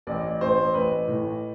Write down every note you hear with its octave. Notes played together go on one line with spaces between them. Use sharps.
A1 D5
A1 C5
A1 B4
A2